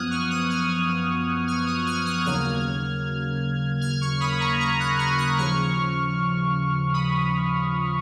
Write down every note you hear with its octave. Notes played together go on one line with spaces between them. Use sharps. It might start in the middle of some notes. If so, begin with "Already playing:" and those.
Already playing: F#2 F3 B3 D#6 F6 F#6 G#6
C#6 F6
D#6 F#6
F6 G#6
F6 G#6
D#6 F#6
F6 G#6
D#6 F#6
D#2 C#3 F#3 A#3 F6 G#6
F6 G#6
C#6 F6
B5 D#6
A#5 C#6
A#5 C#6
D#6 F#6
F6 G#6
D#6 F#6
D#2 C#3 F3 C#6 F6
B5 D#6